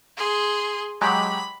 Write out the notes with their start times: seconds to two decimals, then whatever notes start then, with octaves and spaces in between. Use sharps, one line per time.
0.17 G#4 C6
1.01 F#3 G#3 G4 B5